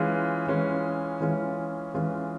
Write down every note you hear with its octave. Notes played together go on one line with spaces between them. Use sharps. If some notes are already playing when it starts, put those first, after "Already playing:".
Already playing: E3 G#3 C#4 F4
E3 G#3 C#4 F4
E3 G#3 C#4 F4
E3 G#3 C#4 F4